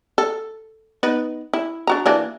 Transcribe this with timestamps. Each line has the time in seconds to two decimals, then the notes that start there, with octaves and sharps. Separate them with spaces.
0.18 A4
1.03 B3 D#4 B4
1.54 E4
1.87 D4 F#4 A#5
2.06 E3 A#3 D4